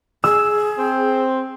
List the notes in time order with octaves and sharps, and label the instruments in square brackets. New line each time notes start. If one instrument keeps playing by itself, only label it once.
[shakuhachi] G#4 [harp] E6
[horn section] C4